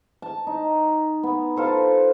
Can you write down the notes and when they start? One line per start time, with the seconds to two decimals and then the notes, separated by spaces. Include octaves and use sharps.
0.22 A5
0.47 D#4
1.23 B3
1.56 F4 A4 C5